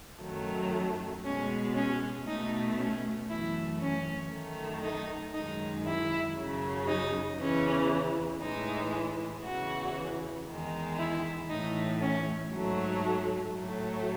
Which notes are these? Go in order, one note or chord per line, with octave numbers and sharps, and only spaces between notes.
F#2 D#3 F#3 A3
B2 G#3 C#4
C#4
B2 A3 D#4
C#4
F#2 E3 A3 E4
C#4
F#2 D#3 A3
D#4
F#2 D#3 G#3 D#4
E4
F#2 C#3 F#3
D#4
E2 C#3 E3 C#4
A2 E3 G#3 D#4
E2 C#3 E3 F#4
E2 D#3 G#3
E4
A2 E3 A3 D#4
C#4
G#2 F#3 A3
A2 F#3 A3